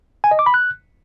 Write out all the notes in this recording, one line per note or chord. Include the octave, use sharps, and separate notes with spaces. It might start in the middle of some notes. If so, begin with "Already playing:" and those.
G#5
D#5
D6
B5
F#6